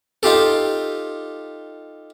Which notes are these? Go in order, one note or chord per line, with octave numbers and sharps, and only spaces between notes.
D#4 F4 G4 A4